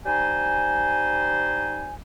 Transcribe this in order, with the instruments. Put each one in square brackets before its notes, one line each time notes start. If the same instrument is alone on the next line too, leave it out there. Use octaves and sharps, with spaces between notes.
[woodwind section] G3 D#4 C5 G#5